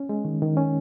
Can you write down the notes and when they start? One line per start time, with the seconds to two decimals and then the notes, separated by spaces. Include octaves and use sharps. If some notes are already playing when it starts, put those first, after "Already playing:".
Already playing: C#4
0.09 G#3
0.25 D#3
0.42 D#3
0.57 C#4